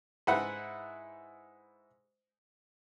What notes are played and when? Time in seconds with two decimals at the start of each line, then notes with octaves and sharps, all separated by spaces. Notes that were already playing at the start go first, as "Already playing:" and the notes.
0.27 G#2 E4 B4 F#5